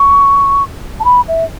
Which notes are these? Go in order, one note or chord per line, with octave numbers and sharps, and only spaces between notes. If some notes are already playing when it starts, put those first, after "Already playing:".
Already playing: C#6
A5
B5
E5